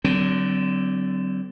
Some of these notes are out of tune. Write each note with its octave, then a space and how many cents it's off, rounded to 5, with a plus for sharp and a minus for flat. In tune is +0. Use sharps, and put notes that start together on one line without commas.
D3 +0 F#3 +40 C4 -30